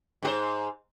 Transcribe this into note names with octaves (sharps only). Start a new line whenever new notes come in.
G#2 F#4 C5